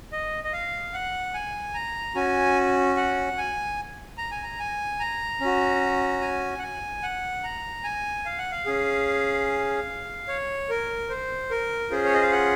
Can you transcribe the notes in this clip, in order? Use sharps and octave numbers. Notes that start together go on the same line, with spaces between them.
D#5
D#5
F5
F#5
G#5
A#5
C#4 F#4 G#5
F#5
G#5
A#5
G#5
A#5
G#5
A#5
C#4 F#4
G#5
F#5
G#5
F#5
A#5
G#5
F5
F#5
F5
C#4 G#4
C#5
A#4
C5
A#4
C#4 F4 G#4 C5
C#5
D#5
F5
F#5